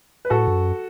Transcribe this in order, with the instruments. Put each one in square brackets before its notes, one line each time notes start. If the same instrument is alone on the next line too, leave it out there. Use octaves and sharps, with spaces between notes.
[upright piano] B4
[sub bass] A2 [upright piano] F#4 A4
[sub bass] G2
F#2